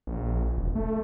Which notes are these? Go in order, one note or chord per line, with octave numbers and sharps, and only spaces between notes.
A#1
E1
A3